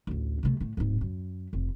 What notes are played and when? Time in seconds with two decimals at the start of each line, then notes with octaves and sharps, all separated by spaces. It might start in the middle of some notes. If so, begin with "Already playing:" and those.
0.07 A1 D2
0.43 C3 A3
0.60 A2 A3
0.77 D1 G#2
1.01 F#2
1.53 F1